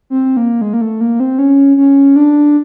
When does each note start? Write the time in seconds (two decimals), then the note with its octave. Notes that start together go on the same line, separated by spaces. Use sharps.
0.10 C4
0.37 A#3
0.61 G#3
0.73 A#3
0.81 A3
1.01 A#3
1.20 C4
1.39 C#4
1.77 C#4
2.16 D4